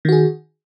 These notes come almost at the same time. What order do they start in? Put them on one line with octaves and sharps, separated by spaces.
D#3 F#4 G#4